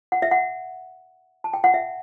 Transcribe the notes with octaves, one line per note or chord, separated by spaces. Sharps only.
F#5
E5
F#5
A5
G5
F#5
E5